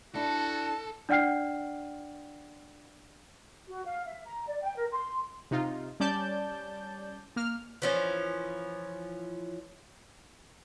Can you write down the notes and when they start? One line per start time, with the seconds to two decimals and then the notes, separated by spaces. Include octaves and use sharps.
0.15 D4 E4 F#4 A4 A5
1.09 D4 D5 F#5 G5 F6 C7
3.67 F#4
3.86 F5
4.07 E5
4.24 A#5
4.48 D5
4.62 G5
4.75 A#4
4.91 C6
5.51 C3 D#4 F4
6.00 G3 C#4 D5 A5 G6
7.36 A#3 F6
7.82 E3 F3 C#4